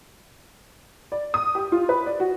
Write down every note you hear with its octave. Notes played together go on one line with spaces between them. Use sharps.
D5
D#6
G4
F4
B4
D5
F#4